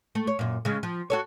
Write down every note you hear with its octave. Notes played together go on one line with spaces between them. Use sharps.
A3
C#5
F#2 A#2
C#3 G#3
F3
F#4 A4 C#5